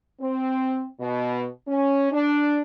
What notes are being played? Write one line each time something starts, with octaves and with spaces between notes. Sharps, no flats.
C4
B2
C#4
D4